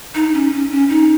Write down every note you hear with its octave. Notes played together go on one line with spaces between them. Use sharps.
D#4
C#4
C#4
C#4
D#4